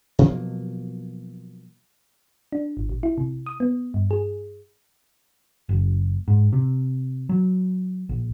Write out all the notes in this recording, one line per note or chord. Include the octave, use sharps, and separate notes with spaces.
B2 F3 F#3 A#3
D4
G#1
A#1
E4
C3
D#6
B3
G2
G#4
F#1
G#2
C3
F#3
A#1